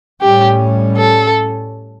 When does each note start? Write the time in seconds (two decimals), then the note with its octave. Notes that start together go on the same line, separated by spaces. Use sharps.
0.21 A2 G3 C#4 G4
0.97 A4